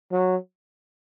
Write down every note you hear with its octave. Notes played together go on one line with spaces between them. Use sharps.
F#3